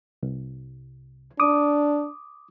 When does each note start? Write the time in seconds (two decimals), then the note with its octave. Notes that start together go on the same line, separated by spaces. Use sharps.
0.23 C2
1.40 D4 D6 D#6